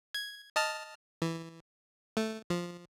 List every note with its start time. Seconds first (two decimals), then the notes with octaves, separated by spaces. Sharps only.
0.14 G#6
0.56 D#5 A5 F6
1.22 E3
2.17 A3
2.50 F3